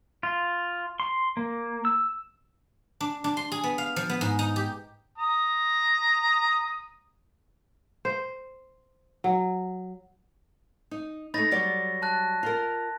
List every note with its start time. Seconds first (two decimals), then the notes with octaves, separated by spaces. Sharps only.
0.23 F4
1.00 C6
1.37 A#3
1.85 E6
3.00 D4
3.24 D4
3.37 C6
3.52 G#4
3.64 B3
3.78 F5
3.96 F3
4.09 B3
4.21 G#2
4.39 D#4
4.56 G4
5.18 A#5 D#6
8.05 C5
9.24 F#3
10.91 D#4
11.34 A3 D#4 B5 A6 A#6
11.51 F#3 G3 D5
12.02 A5 F#6 A6
12.43 F4 A#4